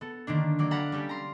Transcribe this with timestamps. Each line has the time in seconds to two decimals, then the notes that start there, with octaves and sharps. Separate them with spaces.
0.01 B3 A4
0.27 D3 D#3 A#3 D4
0.59 F#3 A#3 D5
0.71 A4 F5 F#5 A#5 B5
0.92 G3 C#4 G4 A4
1.09 A#5 C6